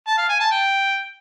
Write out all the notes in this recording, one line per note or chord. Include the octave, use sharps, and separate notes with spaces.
A5
F5
G#5
A5
G5